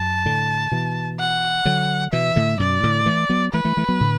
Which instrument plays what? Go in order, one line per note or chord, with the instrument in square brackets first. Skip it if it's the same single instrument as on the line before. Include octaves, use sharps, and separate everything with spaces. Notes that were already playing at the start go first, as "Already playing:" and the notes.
Already playing: [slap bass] F#2 [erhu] A5
[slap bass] A2 D3
B2 E3
[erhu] F#5
[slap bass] D3 F#3
[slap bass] B2 E3 [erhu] E5
[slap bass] A2 D3
[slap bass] F#2 B2 [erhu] D5
[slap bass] A2 D3
E3 A3
F#3 B3
[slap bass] E3 A3 [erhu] B4
[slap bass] E3 A3
E3 A3
F#3 B3
A2 D3